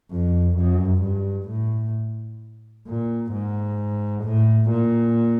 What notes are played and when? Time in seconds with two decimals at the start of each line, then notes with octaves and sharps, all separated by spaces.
0.11 F2
0.57 F#2
1.02 G2
1.48 A2
2.87 A#2
3.32 G#2
4.24 A2
4.70 A#2